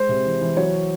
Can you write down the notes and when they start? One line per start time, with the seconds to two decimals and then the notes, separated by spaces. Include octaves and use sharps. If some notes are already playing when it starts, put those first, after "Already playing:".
Already playing: G#3 C5
0.09 C3
0.26 E3
0.41 E3
0.57 F#3 C#5